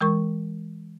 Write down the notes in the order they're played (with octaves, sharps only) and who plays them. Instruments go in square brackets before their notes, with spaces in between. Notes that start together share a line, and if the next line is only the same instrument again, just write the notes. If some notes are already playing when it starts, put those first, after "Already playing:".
[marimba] E3 G#3 A#4 C#6